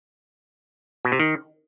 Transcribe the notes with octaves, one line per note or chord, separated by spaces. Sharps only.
B2
C3
D#3